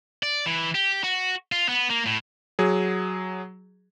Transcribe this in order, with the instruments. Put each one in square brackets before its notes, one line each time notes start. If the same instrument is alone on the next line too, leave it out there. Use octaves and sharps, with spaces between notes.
[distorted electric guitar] D5
E3
G4
F#4
F4
B3
A#3
A2
[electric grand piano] F#3 G#4